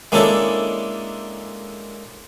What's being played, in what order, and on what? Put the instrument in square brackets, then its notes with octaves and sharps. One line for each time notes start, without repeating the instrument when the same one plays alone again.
[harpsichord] G#3 A#3 C#4 D4 E4 A4